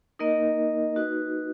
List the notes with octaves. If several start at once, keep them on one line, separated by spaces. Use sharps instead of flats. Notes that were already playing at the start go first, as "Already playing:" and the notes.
A#3 D#4 A#4 D#5
D#4 F#4 B4